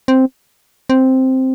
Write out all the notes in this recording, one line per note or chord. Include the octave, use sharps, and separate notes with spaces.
C4
C4